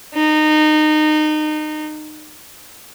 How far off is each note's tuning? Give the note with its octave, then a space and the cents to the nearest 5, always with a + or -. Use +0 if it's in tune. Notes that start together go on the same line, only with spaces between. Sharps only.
D#4 -25